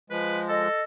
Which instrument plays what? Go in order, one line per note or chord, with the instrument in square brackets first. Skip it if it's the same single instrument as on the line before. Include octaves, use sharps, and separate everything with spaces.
[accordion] F3 G#3 [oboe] B4
[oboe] A4 [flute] D#5